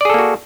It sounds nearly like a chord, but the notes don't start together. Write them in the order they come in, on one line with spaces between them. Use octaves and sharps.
D5 G#4 A4 A#3 F#4